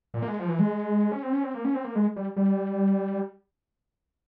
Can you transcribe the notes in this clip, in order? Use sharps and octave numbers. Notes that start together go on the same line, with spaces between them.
A#2
A#3
G#3
F3
E3
G#3
C#4
C4
C#4
C4
A#3
C#4
C4
A#3
G#3
G3
G3